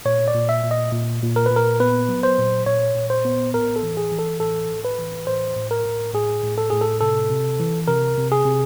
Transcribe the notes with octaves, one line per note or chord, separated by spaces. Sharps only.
A#2 C#5
D5
A#2
E5
A#2
D#5
A#2
A#2
A#4
A#2 B4
A#4
B3 B4
F#3
C5
A#2
A#2 C#5
A#2
C5
B3
A2 A#4
A4
E3
G#4
E3
A4
A2 A4
A2
B4
E3
A2 C5
A2
A#4
A2
A2 G#4
A2
A4
A2 G#4
A4
C3 A4
C3
E3
C3 A#4
C3
G#4
C3